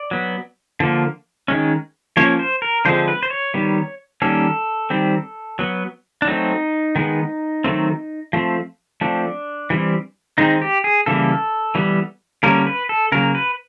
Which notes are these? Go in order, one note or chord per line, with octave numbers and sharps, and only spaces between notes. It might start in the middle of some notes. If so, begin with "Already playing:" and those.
Already playing: D5
F#3 B3
D3 F3 A#3
D#3 G#3 C#4
F3 A#3 C#4 C#5
C5
A#4
D3 F3 G#3 C4 C5
B4
C5
C#5
D#3 G3 B3
D#3 G3 A#3 C#4 A4
D#3 G3 C4
F#3 B3
D4
F#3 A3 C4 D#4
D#3 G#3 B3
D#3 F#3 A3 C4
F3 A3 C4
F3 A3 C4 D4
E3 G3 C4
D#3 G#3 C4 D#4
G4
G#4
C#3 E3 G3 A#3 A4
E3 G3 B3
D3 G3 A#3 C#4 A#4
B4
A4
C#3 F#3 A#3 A#4
B4